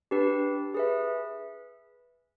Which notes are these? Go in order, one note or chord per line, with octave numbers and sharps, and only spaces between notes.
D4 G4 B4
G#4 B4 E5